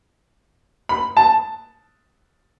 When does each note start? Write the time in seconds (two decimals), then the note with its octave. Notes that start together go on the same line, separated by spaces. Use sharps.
0.89 B5
1.17 A5